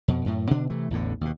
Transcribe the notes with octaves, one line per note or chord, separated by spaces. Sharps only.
F2 B2
F#2 A2
B2 D3 D4
C3 E3 A3
A1 E2 A2 D3
D#2 B2